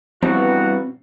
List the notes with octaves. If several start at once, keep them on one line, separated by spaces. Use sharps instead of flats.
G2 E3 F3 G3 B3 C4 F#4